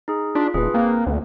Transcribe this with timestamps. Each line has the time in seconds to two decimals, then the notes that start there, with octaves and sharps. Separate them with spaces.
0.08 D#4 G#4
0.35 D4 F4
0.54 D#1 G#4 B4
0.74 A#3 C4
1.07 D2